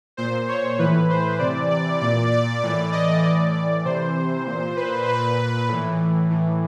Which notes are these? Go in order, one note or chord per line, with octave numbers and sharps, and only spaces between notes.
A#2 C5
C#5
A2 E3 B4
C5
C3 E3 D5
D5
A#2 D5
D5
A2 E3 D5
D#5
A2 E3 D5
D5
C3 E3 C5
A#2
B4
A#2 B4
A2 E3
A2 E3